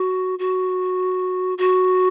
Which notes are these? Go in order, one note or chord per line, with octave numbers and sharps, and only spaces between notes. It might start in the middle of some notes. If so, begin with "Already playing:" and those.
Already playing: F#4
F#4
F#4